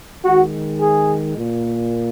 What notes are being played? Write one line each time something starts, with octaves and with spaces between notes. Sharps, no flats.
D#3 G#3 F#4
G#4
A#2 A#3